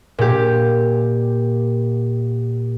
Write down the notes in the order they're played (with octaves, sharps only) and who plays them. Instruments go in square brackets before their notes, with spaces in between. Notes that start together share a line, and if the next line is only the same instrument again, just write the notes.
[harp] A#2 G4